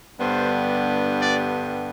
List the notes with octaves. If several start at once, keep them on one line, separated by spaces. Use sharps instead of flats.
G2 D3 G3 B3 C5
D5